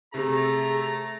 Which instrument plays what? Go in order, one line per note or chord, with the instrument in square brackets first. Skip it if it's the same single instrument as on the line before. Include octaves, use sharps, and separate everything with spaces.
[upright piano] C3 [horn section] A3 A#5 [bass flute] G#4